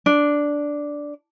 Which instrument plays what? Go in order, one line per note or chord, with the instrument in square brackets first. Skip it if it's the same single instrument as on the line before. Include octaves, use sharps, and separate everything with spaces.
[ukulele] D4